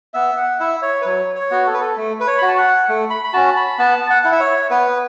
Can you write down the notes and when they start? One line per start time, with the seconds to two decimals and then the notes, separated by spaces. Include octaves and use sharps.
0.14 B3 E5
0.37 F#5
0.60 E4 E5
0.82 C#5
1.02 B4
1.05 F#3 C#5
1.36 C#5
1.51 B3 F#4
1.67 A4
1.74 B4
1.81 A4
1.97 A3
2.20 B4
2.27 C#5
2.38 F#4 B5
2.48 A5
2.58 F#5
2.89 A3
3.10 B5
3.24 B5
3.33 C#4 F#4 A5
3.56 B5
3.79 B3 A5
4.10 F#5
4.23 E4 F#5
4.32 E5
4.40 C#5
4.71 B3 B4